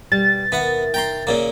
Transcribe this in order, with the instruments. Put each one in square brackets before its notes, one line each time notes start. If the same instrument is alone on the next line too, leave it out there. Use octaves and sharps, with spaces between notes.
[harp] B2 [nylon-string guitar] G3 [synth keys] A6
[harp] D#2 D#3 [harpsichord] B3 F#5 [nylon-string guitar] E5
[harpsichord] G5 A#5 C6
[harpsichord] A#2 C#3 A#3 [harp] E6 G#6